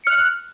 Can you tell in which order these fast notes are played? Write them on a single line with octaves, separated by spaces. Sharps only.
C#7 F6 F#6